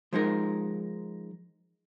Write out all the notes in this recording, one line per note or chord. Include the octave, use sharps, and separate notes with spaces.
F3 G#3 D#4 A#4